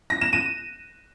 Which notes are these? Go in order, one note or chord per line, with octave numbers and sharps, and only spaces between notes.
A#6
E7
D#7